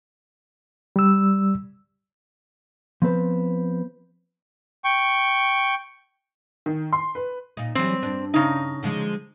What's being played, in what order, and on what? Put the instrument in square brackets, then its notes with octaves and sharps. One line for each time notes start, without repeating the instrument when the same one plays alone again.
[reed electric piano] G3 E6
[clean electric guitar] F3 B3 C4 B4 C5
[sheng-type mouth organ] G5 C#6
[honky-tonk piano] D#3
C6
B4
[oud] A#2 D#4
[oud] E3 F#3 G3 [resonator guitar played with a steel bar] C4
[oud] G2 D4
[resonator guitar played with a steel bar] C#3 D#4
[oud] D3 F3 G#3